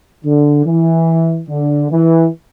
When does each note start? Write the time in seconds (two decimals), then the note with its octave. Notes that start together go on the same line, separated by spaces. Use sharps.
0.25 D3
0.66 E3
1.49 D3
1.90 E3